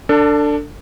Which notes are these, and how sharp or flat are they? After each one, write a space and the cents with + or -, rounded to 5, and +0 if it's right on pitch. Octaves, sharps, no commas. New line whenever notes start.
D4 +0 A4 +30